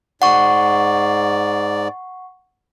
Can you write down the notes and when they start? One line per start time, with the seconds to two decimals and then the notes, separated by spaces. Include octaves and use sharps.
0.22 G#2 D5 F#5 C#6